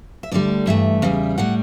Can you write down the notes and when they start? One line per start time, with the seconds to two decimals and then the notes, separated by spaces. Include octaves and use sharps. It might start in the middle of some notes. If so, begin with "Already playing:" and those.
0.23 E5
0.32 D2 D3 G3 D5
0.67 G2 E3 A3 E5
1.02 E2 C#3 G3
1.38 A2 G3 F#5